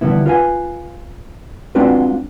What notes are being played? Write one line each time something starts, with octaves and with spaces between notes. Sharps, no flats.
D3 E3 G3 B3 E4
F4 B4 F5 G#5
G#3 C4 D4 F4 F#4 B4